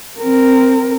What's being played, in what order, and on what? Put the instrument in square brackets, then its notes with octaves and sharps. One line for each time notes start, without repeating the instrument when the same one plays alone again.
[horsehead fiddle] C4 A#4